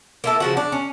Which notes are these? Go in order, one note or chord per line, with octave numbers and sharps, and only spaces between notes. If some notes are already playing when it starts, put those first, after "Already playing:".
A#3 E4 A4
C#3 F3 F#4
D4
C#4